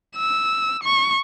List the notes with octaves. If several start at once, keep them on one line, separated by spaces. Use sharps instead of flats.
E6
C#6